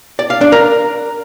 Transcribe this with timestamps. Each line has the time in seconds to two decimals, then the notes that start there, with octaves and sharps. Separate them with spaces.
0.19 D5
0.30 F5
0.41 D4
0.52 A#4